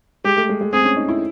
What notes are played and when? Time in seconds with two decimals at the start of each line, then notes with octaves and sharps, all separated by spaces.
0.24 G#3 G4
0.37 A3
0.49 G#3
0.61 G#3
0.73 C4 G#4
0.85 C#4
0.96 D#4
1.08 E4